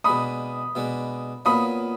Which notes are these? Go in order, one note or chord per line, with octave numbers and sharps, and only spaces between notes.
B2 G#3 D4 B5 D#6
B2 G#3 D4
A#2 F#3 B3 F4 B5 D#6